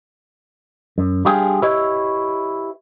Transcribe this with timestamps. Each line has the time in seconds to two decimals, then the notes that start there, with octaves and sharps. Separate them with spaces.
0.98 F#2
1.25 G3 D4 F4 G4 G#4
1.62 E4 G4 B4 C#5 D#5 E5